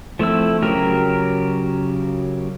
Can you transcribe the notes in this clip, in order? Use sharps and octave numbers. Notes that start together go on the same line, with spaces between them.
F3 A3 C4 E4 E6
C#3 F#3 G4 A#4